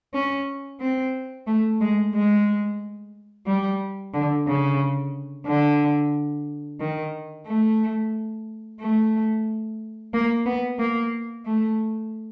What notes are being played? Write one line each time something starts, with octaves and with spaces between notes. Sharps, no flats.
C#4
C4
A3
G#3
G#3
G3
D3
C#3
D3
D#3
A3
A3
A#3
B3
A#3
A3